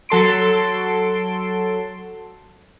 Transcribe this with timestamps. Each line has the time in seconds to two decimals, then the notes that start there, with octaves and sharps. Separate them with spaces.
0.09 F#3 A4 C6 D7